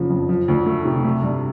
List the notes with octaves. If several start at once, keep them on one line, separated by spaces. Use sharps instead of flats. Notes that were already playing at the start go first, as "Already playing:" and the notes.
Already playing: F#1 C#3 F3
F2
F3
D2
A3
C3
A3
G2